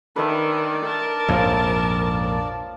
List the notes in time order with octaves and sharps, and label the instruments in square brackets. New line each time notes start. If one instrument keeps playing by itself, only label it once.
[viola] D#3 [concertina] D4 D5 [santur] B4 E5
[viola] A#4 A5
[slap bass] A#1 F2 G#2 [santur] F3 C#5 F5